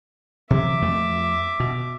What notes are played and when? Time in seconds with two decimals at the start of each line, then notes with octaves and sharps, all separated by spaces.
0.50 C3 E3 F#3 E5 D6
0.82 F2 A3
1.60 B2